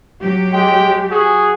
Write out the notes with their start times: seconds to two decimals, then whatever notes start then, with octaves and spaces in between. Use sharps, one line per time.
0.21 F#3 G4
0.53 G#3 G5
1.11 F#4 G#4